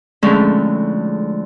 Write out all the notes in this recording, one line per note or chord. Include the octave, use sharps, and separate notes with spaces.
F2 D3 G#3 A3 C#4 E4